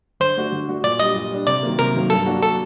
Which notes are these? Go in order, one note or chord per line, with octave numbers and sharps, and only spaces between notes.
D3 C5
A3 D4 F#4
D3
A3 D4 F#4
A#2 D5
G3 D4 D#5
A#2
G3 D4
C3 D5
D#3 F#3 A#3
C3 A#4
D#3 F#3 A#3
G2 A4
F#3 A#3 D4 F#4
A4